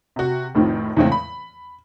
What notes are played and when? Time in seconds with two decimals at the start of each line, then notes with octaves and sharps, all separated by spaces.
0.16 C3 F#4
0.55 F1 A2 D#3 F3 C4
0.97 E2 A2 C#3 E3 G#3 C4
1.12 B5